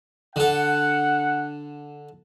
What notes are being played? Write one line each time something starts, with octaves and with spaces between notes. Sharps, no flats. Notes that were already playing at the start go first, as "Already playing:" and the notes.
D3 A4 F#5